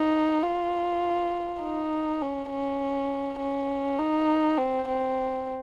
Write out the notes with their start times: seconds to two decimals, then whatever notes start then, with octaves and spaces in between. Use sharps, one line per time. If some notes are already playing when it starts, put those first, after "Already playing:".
Already playing: D#4
0.43 F4
1.61 D#4
2.21 C#4
2.50 C#4
3.39 C#4
3.98 D#4
4.58 C4
4.88 C4